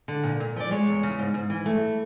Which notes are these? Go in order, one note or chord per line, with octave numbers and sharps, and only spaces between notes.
D3
A#2
A#2
F3 D5
G#3 C#5
E2
C#3
G#2
G#2
E3
A3